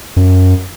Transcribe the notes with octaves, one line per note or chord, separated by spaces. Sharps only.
F#2